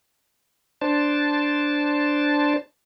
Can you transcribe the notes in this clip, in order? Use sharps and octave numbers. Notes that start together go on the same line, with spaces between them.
D4 C5 A5